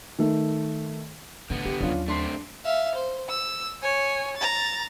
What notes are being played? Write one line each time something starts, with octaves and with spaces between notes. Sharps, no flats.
D#3 A3
A2 D3 B3
E3 G4
D#2 F#3 C#4 D4 F4
A3 C4 D4 C6 C7
E5 F5
C5
E6
C#5 G#5
A#5 A6